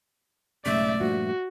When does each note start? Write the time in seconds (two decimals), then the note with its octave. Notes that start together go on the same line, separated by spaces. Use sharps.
0.66 B1 G#2 C#3 A3 D5 E5
1.01 G2 A#2 F3 F#4